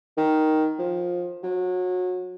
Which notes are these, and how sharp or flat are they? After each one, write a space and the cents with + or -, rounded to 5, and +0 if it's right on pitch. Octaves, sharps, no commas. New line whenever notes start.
D#3 +5
F3 +20
F#3 -25